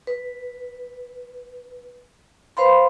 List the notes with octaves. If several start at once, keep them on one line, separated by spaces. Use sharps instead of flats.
B4
B4 C5 F5 B5 C6